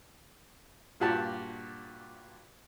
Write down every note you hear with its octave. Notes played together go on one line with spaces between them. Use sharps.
G2 A#2 F#4 G4 A5